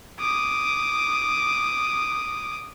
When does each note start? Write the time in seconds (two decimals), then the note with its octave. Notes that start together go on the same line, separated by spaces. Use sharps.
0.20 D6 D#6